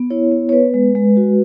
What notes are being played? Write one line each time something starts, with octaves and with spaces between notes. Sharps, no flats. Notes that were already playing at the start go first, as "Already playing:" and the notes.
Already playing: B3
E4 C#5
B3
C#5
B3 B4
G#3
G#3
F#4